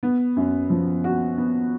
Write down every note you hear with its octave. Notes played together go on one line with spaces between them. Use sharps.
B3
F#2
F3
F#4
B3